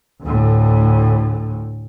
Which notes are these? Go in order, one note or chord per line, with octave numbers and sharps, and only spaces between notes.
D2 A2